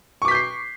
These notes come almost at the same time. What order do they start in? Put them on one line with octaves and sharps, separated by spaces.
C#6 D6 B6 G6 C7